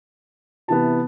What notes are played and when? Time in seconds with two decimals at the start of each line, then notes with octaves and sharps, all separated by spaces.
0.68 C3 E3 B3 A5